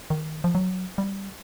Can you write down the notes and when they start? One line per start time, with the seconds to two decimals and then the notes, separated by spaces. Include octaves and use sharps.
0.10 D#3
0.44 F3
0.55 F#3
0.98 G3